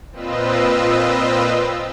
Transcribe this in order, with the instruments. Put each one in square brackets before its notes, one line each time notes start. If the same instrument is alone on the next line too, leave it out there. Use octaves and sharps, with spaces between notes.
[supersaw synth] A#2 C4 F4 B4 D#5 E6